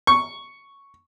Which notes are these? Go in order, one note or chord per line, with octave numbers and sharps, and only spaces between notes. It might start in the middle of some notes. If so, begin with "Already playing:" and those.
C#6